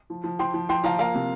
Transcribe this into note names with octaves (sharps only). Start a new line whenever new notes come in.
F3
F3
F3 G5 C6
F3
F3 G5 C6
F3 F5 A#5
A#3 F5 A#5
C3